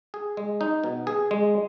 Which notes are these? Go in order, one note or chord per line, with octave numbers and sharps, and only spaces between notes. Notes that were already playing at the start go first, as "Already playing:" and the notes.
G#4
G#3
D#4
B2
G#4
G#3